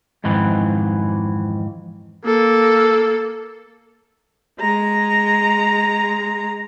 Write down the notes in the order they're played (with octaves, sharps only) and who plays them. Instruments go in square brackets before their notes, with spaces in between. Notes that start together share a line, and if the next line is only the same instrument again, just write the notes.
[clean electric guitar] F2 G#2 D#3 E3
[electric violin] A#3 A4
[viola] G#3 A#5